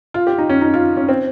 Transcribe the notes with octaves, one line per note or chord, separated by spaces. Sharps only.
F4
G4
D#4
C#4
D#4
F4
C#4
C4